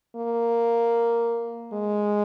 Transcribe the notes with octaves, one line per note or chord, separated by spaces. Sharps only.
A#3
G#3